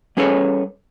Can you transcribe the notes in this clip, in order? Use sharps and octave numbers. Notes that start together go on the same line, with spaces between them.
G3 C#4 G#4 A4 B4 C#5